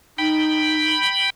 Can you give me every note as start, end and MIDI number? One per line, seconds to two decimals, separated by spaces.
0.18 0.94 63
0.18 1.30 79
0.18 1.30 83